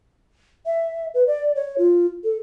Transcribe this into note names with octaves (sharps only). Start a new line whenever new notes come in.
E5
B4
D5
C#5
F4
A4